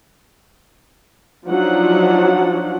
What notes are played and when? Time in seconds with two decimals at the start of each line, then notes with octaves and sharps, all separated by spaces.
1.48 F3 F#3 D4 D#4 F#5